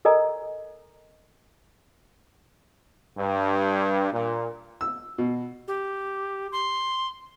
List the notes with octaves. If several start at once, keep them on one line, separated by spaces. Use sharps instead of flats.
A4 A#4 D#5 G#5 A#5
G2
A#2
E6
B2
G4
C6